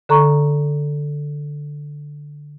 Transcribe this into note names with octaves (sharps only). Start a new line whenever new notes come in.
D3 A4 A#5 C#6